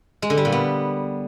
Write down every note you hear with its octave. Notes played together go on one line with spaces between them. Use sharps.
G#3
D3
G3
A#2
B3